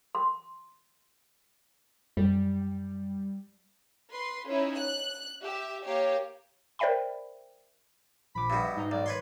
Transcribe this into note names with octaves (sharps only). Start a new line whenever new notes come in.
C6
F#2 G3
B4 C6
C#4 D#4 E4
F#6
G4 E5
A#3 G4 C#5
A#4 C5 D5 E5 G5 B5
A#1 F3 B5 D6
G2 B2
E5
G#2 D#4 A#5
B1 D5
B4 C#5 C6